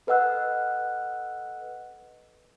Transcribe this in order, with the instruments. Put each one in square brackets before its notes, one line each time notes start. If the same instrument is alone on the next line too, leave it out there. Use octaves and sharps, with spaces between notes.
[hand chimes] A4 B4 D#5 F#5 E6 F#6